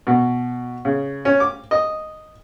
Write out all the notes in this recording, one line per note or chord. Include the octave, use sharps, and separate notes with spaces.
B2
C#3
C#4
D6
D#5